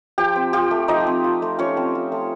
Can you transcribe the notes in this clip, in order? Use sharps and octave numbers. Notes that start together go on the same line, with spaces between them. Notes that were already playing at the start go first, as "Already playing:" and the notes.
F3 G4 G5
C4
F4 G4 G5
A3
F3 D#4 D#5
C4
F4
A3
F3 C#4 C#5
C4
F4
A3